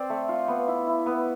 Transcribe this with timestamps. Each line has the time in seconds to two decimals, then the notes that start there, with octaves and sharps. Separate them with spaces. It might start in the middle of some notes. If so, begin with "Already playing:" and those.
Already playing: C4 C5 D5
0.10 A3
0.29 F4
0.48 B3
0.68 E4
0.87 E4
1.06 B3